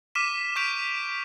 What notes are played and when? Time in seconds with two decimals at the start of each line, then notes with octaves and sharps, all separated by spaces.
0.15 D6 F6 B6 D#7 E7
0.56 C#6 D6 G6 B6 D7 F7